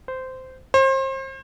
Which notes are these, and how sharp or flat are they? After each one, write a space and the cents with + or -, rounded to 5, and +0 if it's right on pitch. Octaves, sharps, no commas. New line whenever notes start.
C5 -15
C5 +35